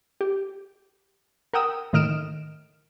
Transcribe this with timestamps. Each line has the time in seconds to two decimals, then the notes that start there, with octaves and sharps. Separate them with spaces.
0.21 G4
1.53 A#4 F#5 G5 D#6 E6
1.93 A2 D#3 D#5 F6 D7 E7